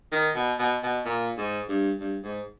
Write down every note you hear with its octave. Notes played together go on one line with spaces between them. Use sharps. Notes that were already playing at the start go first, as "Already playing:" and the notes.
D#3
B2
B2
B2
A#2
G#2
G2
G2
G#2